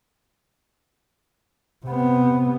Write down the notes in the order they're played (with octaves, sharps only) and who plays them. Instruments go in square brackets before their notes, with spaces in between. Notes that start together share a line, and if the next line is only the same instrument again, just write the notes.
[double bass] C3 B3